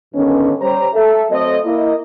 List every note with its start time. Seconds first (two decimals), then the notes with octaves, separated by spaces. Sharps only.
0.15 G2 D3 D#3 B3 C#4
0.61 G3 C5 C#5 A#5
0.94 A4 E5
1.31 F#3 A3 C4 A4 D#5
1.65 A#3 E4 A#4 D#5